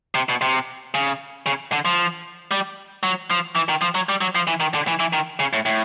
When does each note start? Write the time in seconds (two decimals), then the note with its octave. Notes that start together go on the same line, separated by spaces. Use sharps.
0.15 C3
0.29 B2
0.41 C3
0.94 C#3
1.46 C#3
1.72 D3
1.85 F3
2.51 G3
3.03 F#3
3.30 F3
3.55 E3
3.69 D#3
3.82 F3
3.95 F#3
4.09 G3
4.21 F#3
4.35 F3
4.47 E3
4.60 D#3
4.75 D3
4.88 E3
5.00 E3
5.13 D#3
5.40 C#3
5.53 A2
5.66 A2